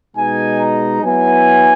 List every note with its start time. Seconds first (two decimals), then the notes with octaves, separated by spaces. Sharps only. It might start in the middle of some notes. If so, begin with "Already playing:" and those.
0.16 B2 G#3 D#4 G#5
0.59 A#5
1.03 F#3 B3 E4 G#5